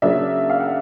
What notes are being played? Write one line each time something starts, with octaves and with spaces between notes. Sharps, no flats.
C#3 F#3 A#3 D4 E5
F5
F#5